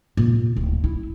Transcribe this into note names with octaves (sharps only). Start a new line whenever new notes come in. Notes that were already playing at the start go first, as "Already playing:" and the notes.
A#2
D1
E4